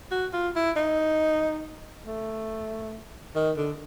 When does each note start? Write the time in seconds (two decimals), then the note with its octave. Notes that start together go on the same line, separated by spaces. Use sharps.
0.11 F#4
0.33 F4
0.55 E4
0.77 D#4
2.06 A3
3.36 D#3
3.57 D3